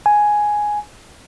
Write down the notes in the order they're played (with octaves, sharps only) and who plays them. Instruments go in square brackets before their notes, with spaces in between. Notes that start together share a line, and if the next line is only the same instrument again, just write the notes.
[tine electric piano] G#5